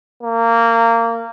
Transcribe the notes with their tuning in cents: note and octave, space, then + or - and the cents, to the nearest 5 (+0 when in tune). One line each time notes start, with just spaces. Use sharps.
A#3 -20